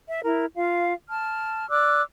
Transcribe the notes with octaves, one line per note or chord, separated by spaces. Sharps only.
E5
E4 A#4
F4 F5
A5 F6
D5 D6 E6 F#6